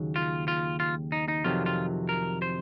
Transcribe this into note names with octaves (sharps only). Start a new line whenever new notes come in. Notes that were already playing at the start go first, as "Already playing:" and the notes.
Already playing: D#2 C#3 F#3
F4
F4
F4
D#4
D#4
F2 C3 D#3 F#3 F4
F4
A#4
C5